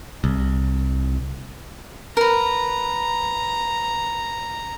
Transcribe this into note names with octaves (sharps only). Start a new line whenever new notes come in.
C2
A#4 B4 A#5